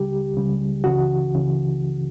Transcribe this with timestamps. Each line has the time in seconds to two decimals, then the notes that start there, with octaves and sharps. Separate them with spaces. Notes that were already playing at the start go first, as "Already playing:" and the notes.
Already playing: C#2 C#3 G3 G4
0.34 C#2 C#3 G3
0.84 C#2 C#3 E3 F#4
1.34 C#2 C#3 E3